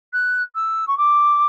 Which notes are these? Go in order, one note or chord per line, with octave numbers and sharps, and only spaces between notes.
F#6
E6
C#6
D6